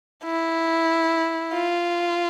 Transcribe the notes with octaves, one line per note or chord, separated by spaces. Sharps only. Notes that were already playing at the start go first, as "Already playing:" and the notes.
E4
F4